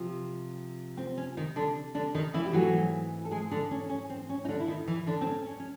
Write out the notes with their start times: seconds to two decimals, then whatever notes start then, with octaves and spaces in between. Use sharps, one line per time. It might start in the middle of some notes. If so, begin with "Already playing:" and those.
Already playing: C3 F3
0.97 C4
1.18 C#4
1.37 D#3 D#4
1.56 D3 D4
1.95 D3 D4
2.15 D#3 D#4
2.34 E3 E4
2.46 G4
2.53 G#2 E3 F#3 A3 C4 F#4
3.25 A4
3.31 G#3 G#4
3.51 D3 D4
3.71 C#4
3.90 C#4
4.10 C4
4.29 C#4
4.45 D#4
4.49 D3 D4
4.60 E4
4.68 D#3 D#4
4.88 E3 E4
5.07 D3 D4
5.21 C4
5.27 C#4
5.46 C#4
5.60 C#4